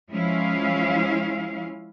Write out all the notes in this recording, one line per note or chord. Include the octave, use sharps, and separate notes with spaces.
F3 G#3 C#4 E4 F5